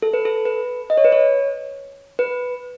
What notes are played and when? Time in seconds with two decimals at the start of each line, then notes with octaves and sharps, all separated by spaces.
0.02 A4
0.13 B4
0.25 A4
0.45 B4
0.90 D#5
0.97 C#5
1.05 B4
1.12 C#5
2.19 B4